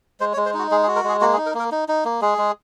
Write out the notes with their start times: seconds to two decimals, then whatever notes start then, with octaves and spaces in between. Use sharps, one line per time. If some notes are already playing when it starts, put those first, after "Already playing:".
0.20 G#3 C5
0.33 C#5
0.37 G#3
0.46 C5
0.54 D#4 F#4
0.71 G#3 G#4
0.83 G#4
0.88 F#4
0.96 A#4
1.04 G#3 G#4
1.21 A#3 F#4
1.33 G#4
1.38 D#4
1.46 A#4
1.54 A#3
1.59 A#4
1.72 D#4
1.88 D#4
2.05 A#3
2.22 G#3 G#4
2.38 G#3